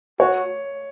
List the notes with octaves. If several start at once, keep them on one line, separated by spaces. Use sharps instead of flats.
F#4 C#5